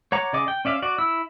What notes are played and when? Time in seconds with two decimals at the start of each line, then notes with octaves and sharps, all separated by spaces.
0.12 C#5 F#5 A#5 D6
0.33 C#3 G#4 D5 D#5 D6
0.48 G5
0.65 C#4 D5 E5 F5
0.82 F#4 D5
0.98 E4 E6